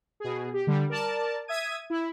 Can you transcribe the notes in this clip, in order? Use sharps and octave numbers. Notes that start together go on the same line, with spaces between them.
B2 G#4
G4
D3 G3
A#4 D5 A5
E5 D#6 G#6 D#7
E4